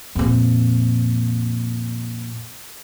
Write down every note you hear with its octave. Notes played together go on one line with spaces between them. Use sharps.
F2 A#2